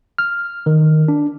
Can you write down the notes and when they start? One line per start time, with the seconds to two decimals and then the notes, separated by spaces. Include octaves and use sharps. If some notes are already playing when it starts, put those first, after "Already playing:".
0.18 F6
0.66 D#3
1.08 D4